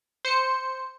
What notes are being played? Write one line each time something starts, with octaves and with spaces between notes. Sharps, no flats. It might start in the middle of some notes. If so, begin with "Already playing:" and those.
C5 C#7